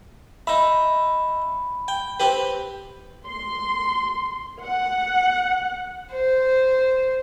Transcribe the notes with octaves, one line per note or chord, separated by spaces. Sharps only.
D#4 E5 B5
G5
C4 G4 B4
C6
F#5
C5